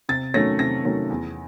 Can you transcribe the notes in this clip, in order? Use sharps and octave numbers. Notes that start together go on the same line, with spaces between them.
C3 A6
D#3 F#3 A3 C#4 A#6
C3 A#6
D#3 F#3 A3 C#4
E2